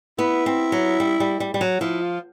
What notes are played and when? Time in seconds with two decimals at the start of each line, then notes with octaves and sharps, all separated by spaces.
0.18 B3 E4
0.46 C4
0.72 F#3
1.00 G3
1.20 G3
1.40 G3
1.54 G3
1.61 F#3
1.81 F3 E4
2.01 F4